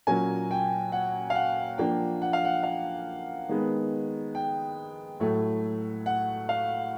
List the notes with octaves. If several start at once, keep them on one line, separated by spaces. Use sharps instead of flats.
A#2 F#3 A#3 C#4 G#5
G5
F#5
F5
F#5
F3 A#3 D4 G5
F#5
F5
F#5
F5
D#3 G#3 B3
G5
A2 F#3 A3
F#5
F5